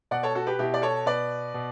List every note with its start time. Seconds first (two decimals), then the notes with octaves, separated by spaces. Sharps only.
0.11 B2 D5 F#5
0.23 A4 C#5
0.35 F#4 A4
0.47 G4 B4
0.59 B2 E4 G4
0.74 D5
0.82 A4 C#5
1.06 B2 B4 D5
1.54 B2